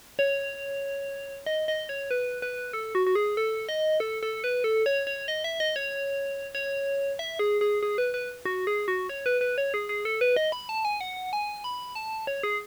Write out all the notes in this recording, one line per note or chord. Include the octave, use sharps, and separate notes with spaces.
C#5
D#5
D#5
C#5
B4
B4
A4
F#4
F#4
G#4
A4
D#5
A4
A4
B4
A4
C#5
C#5
D#5
E5
D#5
C#5
C#5
E5
G#4
G#4
G#4
B4
B4
F#4
G#4
F#4
C#5
B4
B4
C#5
G#4
G#4
A4
B4
D#5
B5
A5
G#5
F#5
G#5
B5
A5
C#5
G#4